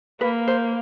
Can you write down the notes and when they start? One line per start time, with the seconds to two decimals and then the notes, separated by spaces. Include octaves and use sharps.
0.21 A#3 B4
0.48 C5